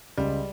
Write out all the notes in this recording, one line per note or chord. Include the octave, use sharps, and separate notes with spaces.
C#2 G3